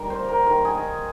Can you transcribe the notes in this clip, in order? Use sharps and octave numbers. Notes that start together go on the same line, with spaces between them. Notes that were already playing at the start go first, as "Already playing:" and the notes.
Already playing: D#3 G3 A#4
C5
A#3
A#4
D#3 A#4
G#4
D#3